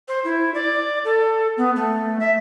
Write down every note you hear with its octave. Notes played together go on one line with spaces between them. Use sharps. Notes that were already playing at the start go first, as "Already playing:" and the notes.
C5
E4
D5
A4
B3
A3
E5